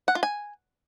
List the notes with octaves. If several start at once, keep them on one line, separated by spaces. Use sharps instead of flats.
F#5
F4
G#5